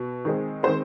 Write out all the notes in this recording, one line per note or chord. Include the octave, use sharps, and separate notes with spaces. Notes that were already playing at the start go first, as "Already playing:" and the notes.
Already playing: B2
D#3 G#3 C4
D#3 G#3 C4 C5